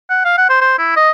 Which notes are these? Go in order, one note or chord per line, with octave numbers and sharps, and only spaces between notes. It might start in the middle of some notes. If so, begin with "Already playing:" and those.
F#5
F5
F#5
C5
C5
E4
D#5